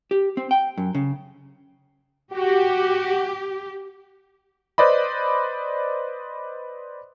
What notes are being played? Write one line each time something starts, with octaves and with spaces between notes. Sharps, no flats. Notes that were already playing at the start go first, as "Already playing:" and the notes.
G4
C4
G5
F#2
C#3
F#4 G4
B4 C5 D5 D#5 B5